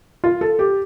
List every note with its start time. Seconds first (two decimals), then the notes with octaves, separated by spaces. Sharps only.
0.24 F4
0.41 A4
0.59 G4